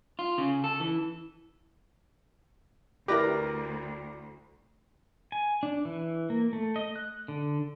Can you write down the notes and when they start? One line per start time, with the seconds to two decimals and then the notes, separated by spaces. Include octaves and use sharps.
0.19 F4
0.38 C#3
0.64 A4
0.80 E3
3.08 D2 E4 G4 A#4 B4 D5 D6 A#6
5.32 G#5
5.63 D4
5.85 E3
6.30 A#3
6.53 A3
6.76 D#5
6.96 F#6
7.28 D3